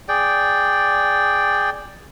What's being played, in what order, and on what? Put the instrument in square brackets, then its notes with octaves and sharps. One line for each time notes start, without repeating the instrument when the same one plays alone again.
[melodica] G#4 D5 G5